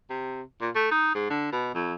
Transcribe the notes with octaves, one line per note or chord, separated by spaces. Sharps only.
C3
A#2
A3
D#4
G#2
D3
B2
F2